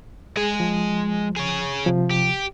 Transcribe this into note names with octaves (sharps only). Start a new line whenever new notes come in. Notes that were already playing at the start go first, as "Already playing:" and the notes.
G#3 G#4 G#5
F3
G#4 C#5
C3 F3
G4